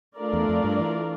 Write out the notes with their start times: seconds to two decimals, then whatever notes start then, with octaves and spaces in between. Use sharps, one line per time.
0.18 A3 D4 F4 A#4 D5
0.33 E2
0.49 F2
0.64 G2
0.79 E3